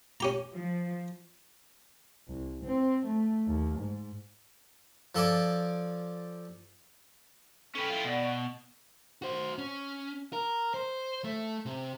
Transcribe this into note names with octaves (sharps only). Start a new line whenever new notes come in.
C#4 G4 A#5
F3
C2
C4
A3
D#2
G#2
F3 A4 D5 G#5 D6
C#4 A4 B4 G5
E4 F4
B2 D5 F#5
C#6
F#4 C5
C#4
A#4
C5
A3
C3